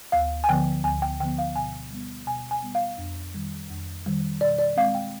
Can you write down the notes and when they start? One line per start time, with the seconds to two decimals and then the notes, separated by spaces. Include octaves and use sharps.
0.12 D2 F5
0.44 G#5
0.49 D3 F3 B3 G5
0.84 D2 G#5
1.02 G5
1.20 D3 F3 B3 G5
1.38 F5
1.56 B2 G#5
1.91 G3 B3
2.26 B2 G#5
2.51 G#5
2.62 G3 B3
2.75 F5
2.98 F2
3.34 D#3 G3
3.70 F2
4.06 D#3 G3
4.41 B2 D5
4.59 D5
4.77 G#3 C4 F5
4.95 G5